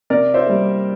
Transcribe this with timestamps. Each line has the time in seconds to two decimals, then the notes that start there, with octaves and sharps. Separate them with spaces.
0.10 C3 A#4 D5
0.34 C5 E5
0.46 G3 A#3